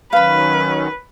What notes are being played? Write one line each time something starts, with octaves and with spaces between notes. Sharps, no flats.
D#3 F#3 C#4 B4 F5 B5